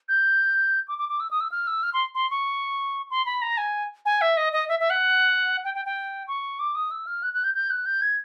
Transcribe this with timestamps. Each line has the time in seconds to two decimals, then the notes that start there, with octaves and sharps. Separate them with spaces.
0.08 G6
0.88 D6
0.99 D6
1.09 D6
1.20 E6
1.31 D#6
1.41 E6
1.52 F6
1.67 E6
1.83 F6
1.94 C6
2.15 C6
2.31 C#6
3.10 C6
3.26 B5
3.42 A#5
3.58 G#5
4.06 G#5
4.21 E5
4.37 D#5
4.53 D#5
4.69 E5
4.80 E5
4.90 F#5
5.64 G5
5.75 G5
5.85 G5
6.28 C#6
6.60 D6
6.75 D#6
6.91 E6
7.07 F6
7.23 F#6
7.34 F#6
7.44 G6
7.54 G6
7.70 F#6
7.86 G6
8.02 G#6